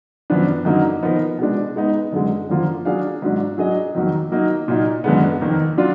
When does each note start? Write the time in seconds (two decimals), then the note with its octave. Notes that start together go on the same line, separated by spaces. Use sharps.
0.30 F#2 F3 B3 D4
0.65 F#2 D3 F#3 A#3 D#4
1.03 F3 B3 D#4 A#4
1.39 B2 G#3 D4
1.76 G#3 B3 D#4
2.13 F#2 D3 G#3
2.49 F#2 D3 F3 A#3 F4
2.85 F#3 D4 G#4 D5 F5
3.22 G#2 F#3 D4
3.58 F#3 D4 G#4 D#5
3.95 F2 D#3 F#3 A#3
4.32 F#3 A#3 D#4
4.68 A#2 F#3 A#3 D#4
5.04 F#2 D3 G#3 B3
5.41 F2 D#3 A#3
5.77 F#3 D4 F4